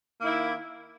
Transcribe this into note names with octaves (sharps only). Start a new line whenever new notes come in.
D#3 A#3 E4